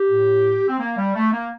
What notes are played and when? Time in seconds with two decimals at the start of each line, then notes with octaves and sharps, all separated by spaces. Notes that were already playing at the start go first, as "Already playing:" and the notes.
Already playing: G4
0.08 A2
0.68 C4
0.79 A#3
0.97 G3
1.15 A3
1.32 A#3